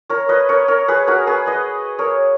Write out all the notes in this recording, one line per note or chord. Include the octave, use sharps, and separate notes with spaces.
A#4 C#5
B4 D#5
A#4 C#5
A#4 C#5
G#4 B4
F#4 A#4
G#4 B4
B4 D#5
A#4 C#5